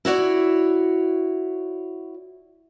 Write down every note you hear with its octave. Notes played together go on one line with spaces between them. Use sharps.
E4 F#4 C#5 D5